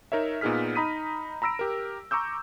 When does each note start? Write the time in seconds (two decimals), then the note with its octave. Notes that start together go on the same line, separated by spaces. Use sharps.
0.12 D#4 A#4 C#5 E5
0.41 A#2 B3 D#4 G#4 F6 B6
0.75 D#4 A#5 B5 D#6 B6 D#7
1.42 A#5 B5 E6 A#6 D7
1.59 G4 A#4
2.11 A#5 C#6 D6 E6 G6